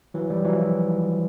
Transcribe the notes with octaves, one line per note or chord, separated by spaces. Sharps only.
E3 F#3
F3 G3
E3 F#3